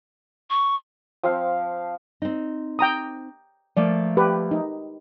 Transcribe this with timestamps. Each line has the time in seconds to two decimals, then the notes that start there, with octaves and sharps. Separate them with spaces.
0.50 C#6
1.23 F3 C4 F5
2.22 C4 D#4
2.79 G5 A#5 D#6
3.77 F3 A3 A#3 D5
4.17 G4 B4
4.51 D#4